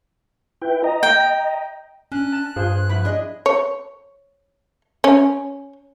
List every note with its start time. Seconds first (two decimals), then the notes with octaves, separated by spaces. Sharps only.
0.62 E4 B4 G5
0.84 D#5 A#5
1.03 G5
2.12 C#4 D4 F#6
2.32 A5
2.56 G2 F4 G#4 C5
2.90 F3 E4 B5
3.05 D4 G#4 D#5
3.46 C#5
5.04 C#4